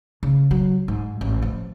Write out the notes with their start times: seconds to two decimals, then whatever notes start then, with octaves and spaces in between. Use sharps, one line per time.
0.23 C#3
0.51 F#3
0.88 G#2
1.21 A1
1.42 F3